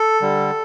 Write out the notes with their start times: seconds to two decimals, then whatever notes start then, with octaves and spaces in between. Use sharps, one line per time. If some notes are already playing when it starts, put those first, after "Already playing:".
Already playing: A4
0.21 D3 G3